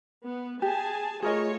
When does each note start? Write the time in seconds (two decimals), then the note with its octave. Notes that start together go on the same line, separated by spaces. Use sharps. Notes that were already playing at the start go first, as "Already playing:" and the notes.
0.24 B3
0.62 G4 G#4 G#5 A5
1.22 A3 F4 G#4 A#4 C#5 D#5